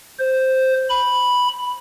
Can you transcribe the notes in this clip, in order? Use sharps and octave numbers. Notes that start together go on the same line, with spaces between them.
C5
B5